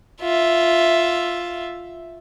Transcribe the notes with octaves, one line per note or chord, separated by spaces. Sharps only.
F4 E5